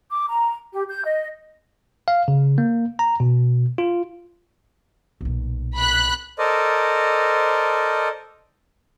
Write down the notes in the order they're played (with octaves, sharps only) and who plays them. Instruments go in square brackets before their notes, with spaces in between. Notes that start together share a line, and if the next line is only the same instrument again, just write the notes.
[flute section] D6
A#5
G4
G6
D#5
[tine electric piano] F5
C#3
A#3
A#5
B2
F4
[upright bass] B1 A#2
[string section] B5 F#6
[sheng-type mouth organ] A4 A#4 C5 D5 D#5